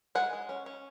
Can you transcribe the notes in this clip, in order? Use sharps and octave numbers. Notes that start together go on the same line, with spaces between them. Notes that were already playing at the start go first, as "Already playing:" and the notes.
G#3 F#5 G#5
G#3
C#4
C#4